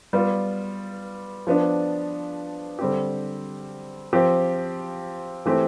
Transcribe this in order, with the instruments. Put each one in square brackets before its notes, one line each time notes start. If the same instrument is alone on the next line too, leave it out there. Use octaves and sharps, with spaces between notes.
[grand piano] G3 B3 F4
F3 B3 D4
D3 G3 C4 G4
F3 C4 G4
E3 A3 C4 G4